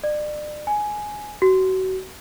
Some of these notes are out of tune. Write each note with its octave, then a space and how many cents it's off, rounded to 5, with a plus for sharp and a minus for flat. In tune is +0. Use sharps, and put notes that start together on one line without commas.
D5 +35
G#5 +10
F#4 +30